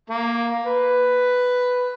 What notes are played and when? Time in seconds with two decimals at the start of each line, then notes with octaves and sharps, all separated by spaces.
0.10 A#3
0.67 B4